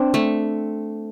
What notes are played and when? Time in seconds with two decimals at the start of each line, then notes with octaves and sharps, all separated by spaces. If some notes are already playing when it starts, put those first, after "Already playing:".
Already playing: C4 D4
0.14 A3